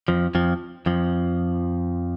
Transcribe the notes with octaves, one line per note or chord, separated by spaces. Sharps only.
F2 F3
F2 F3
F2 F3